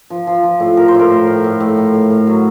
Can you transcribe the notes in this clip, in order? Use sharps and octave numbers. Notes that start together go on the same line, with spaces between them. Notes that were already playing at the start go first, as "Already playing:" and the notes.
F3
F3
F3
A2
A2 A#4
C5
A2
A#4
A2
A2
A2
A2
A2
A2
A2
F#3